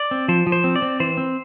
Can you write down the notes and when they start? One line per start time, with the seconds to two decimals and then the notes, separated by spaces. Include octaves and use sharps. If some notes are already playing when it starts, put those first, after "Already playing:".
Already playing: D5
0.11 C4
0.28 F3 C5
0.47 F3
0.52 C5
0.64 C4
0.76 D5
0.82 C4
1.00 E3 C5
1.17 C4